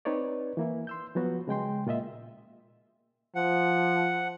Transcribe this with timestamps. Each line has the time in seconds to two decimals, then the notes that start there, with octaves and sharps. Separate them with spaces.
0.05 C4 D#4 B4 C#5 D5
0.57 E3 A#3 E4
0.87 C6 E6 G6
1.15 F3 F#3 B3 F#4
1.48 C#3 G#3 G5 C6
1.87 A#2 F4 D#5 E5
3.35 F3 F#5